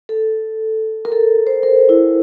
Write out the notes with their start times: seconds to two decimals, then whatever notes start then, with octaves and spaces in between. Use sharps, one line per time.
0.09 A4
1.05 A#4
1.12 A4
1.47 C5
1.63 A#4
1.89 E4